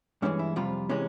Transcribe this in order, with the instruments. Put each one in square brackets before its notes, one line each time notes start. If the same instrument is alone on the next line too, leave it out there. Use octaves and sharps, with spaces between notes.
[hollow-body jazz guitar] G2 E3 G#3 C#4
E4
F2 C3 G3 F4
C3 E3 G#3 C#4